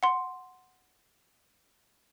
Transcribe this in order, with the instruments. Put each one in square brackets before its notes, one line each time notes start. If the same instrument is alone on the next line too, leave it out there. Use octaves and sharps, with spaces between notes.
[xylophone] F#5 C6